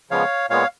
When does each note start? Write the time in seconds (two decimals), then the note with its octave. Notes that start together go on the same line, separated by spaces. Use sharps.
0.11 C#3 F3 G#3 B3 C#5 F5
0.50 A#2 G#3 B3 C#5 F5